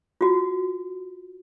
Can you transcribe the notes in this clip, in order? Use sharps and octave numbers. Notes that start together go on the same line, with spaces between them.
F4 F#4